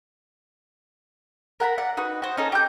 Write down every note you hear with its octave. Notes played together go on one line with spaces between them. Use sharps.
A#4 F#5 A5 B5
D5 F#5
D#4 F#4 B4
F#4 C5
C#4 D#4 A4
G4 D6 G6